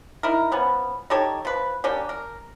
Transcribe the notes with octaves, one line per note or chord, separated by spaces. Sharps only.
D#4 E4 A#4
F3 B3 C#4
D#4 G4 A4 C#5
F3 B4
A#3 C#4 D4 G4
A#4